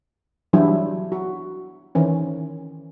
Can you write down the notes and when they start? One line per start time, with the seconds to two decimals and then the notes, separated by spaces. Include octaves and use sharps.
0.53 E3 F#3 G3 D4 E4
1.12 F#4
1.95 D#3 E3 C#4